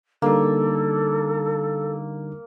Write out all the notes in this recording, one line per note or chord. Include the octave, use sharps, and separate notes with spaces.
D3 G3 A#3 D#4 A4